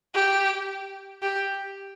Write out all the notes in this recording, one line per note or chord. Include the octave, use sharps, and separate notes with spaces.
G4
G4